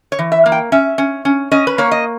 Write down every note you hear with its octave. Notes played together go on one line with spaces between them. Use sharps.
C#5
E3
E5
A#3
G5
C#4 E5
C#4
C#4
C#4 D#5
B4
A#3 C#5
D#5